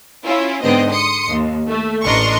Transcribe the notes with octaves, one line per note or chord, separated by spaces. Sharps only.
C#4 E4 F4
G#2 D3 B3 C4 D#5
C6 D#6 C#7
D#2
A3
A1 D4 A#4 D#5 C6 C#6